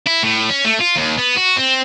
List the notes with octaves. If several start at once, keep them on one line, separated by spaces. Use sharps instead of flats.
E4
A2
C#4
A3
F4
D#2
B3
F#4
C4